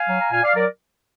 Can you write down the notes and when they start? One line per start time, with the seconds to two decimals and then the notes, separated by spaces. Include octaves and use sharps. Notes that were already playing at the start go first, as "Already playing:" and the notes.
Already playing: F5 G#5
0.08 F#3
0.21 A#5
0.32 A#2 F5 G#5
0.43 D5 F5
0.55 F#3 A#4 D5